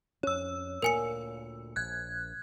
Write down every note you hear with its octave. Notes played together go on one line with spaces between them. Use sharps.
F2 C#4 C#5 E6
D2 A#2 A#4 G#5 C#7
A#1 F#6 G#6